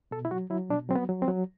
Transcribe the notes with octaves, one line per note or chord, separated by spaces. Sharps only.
B2 A4
E4
F#3 F#4
F#3 E4
B2 D4
F#3 C4
B3
F#3
C4
F#3